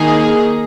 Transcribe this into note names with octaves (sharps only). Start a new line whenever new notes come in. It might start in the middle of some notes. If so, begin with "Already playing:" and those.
Already playing: D#3 A#3 D#4 G#4